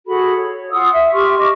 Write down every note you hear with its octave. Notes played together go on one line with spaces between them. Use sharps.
F#4 G#4 A4 B5
C#5
F4 F#5 D#6 E6
E5
G4 C6 C#6 F6
D#5 C#6 D6